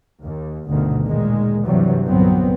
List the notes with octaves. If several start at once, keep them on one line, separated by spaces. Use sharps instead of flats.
D#2
G1 D2 B2 D#3
A#2 D#3 G#3
G2 C3 E3 F#3 G3
G1 C2 A#2 F#3 B3 C4